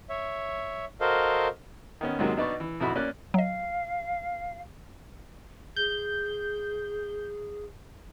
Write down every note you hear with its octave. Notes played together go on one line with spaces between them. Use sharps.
C#5 E5
F#4 A4 A#4 C5 D#5 F5
D#3 B3 C#4
G#2 C3 D#3 F#3 G#3 A#3
B2 D4 D#4 B4 D5 C#6
E3
B1 F2 E4 F#4 B5
A#3 C#4 D5 F#6
F#3 D#5 F5
G#4 G6